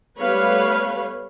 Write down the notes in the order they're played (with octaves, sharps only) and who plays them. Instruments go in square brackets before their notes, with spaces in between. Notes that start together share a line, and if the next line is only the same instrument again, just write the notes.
[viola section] G3 A3 B3 B4 C#5 F5